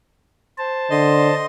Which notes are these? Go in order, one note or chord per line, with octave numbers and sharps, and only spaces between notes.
C5 A5
D3 D#5 C6